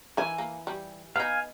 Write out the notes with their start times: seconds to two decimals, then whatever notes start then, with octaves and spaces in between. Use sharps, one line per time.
0.17 E3 A#4 G#5
0.38 A#3
0.67 G3
1.16 B3 D#4 F5 G#5